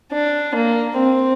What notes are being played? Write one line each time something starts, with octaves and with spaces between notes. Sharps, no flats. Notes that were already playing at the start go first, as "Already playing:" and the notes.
D4
A#3
C4